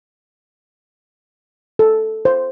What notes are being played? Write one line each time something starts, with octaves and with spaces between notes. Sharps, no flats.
A4
C5